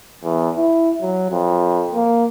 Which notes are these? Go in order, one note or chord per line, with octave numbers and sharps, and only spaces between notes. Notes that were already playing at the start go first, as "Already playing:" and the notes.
E2
E4
F#3
F2
A#3